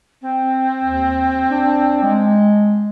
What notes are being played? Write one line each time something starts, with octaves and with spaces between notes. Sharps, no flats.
C4
D#2
D4
G#3